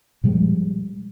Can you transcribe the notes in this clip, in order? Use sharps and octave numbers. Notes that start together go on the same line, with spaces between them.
A#2 F3 G3 G#3